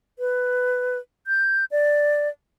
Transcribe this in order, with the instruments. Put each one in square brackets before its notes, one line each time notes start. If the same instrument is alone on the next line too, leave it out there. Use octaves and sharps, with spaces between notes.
[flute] B4
G6
D5